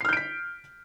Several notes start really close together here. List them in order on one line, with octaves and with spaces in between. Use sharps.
C7 F6 G6 D7 B6